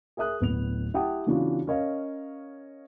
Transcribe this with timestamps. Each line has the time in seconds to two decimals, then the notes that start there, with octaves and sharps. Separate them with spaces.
0.17 G#4 A#4 E5 D#6 F#6
0.41 D1 B3 F7
0.94 E4 G4 F#5 G5 A5 D#6
1.27 C#3 E3 B3 D4 F4 F#4
1.67 C#4 A#4 C#5 D#5 F5